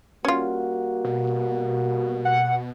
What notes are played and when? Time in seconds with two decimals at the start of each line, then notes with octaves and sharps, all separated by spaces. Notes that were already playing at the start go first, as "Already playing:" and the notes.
0.25 G3 A#3 C#4 F4 F#4
1.05 B2
2.25 F#5